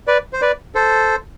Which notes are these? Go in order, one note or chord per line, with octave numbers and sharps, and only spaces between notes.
B4 D5
C5
B4 D5
A4 C5